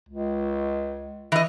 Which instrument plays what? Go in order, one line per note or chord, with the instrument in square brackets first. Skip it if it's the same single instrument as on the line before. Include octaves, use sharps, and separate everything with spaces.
[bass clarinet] C#2
[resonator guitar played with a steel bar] E3 D#5